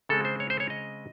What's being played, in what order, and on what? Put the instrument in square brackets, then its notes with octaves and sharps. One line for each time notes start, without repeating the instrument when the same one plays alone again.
[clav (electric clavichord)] C#3 G#3 C4 A4
C5
C#5
C5
C#5
D#5